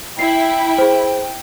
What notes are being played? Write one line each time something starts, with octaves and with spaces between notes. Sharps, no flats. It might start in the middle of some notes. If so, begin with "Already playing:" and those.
E4 G5 C7
G#4 C5